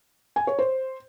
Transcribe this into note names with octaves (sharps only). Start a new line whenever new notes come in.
G#5
C#5
C5